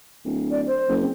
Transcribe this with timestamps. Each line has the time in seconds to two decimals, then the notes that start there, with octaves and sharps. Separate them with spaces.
0.25 D1
0.51 D5
0.67 C5
0.89 F#1
1.01 C4